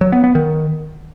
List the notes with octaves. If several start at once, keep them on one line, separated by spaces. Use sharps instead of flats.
F#3
B3
B3
D#3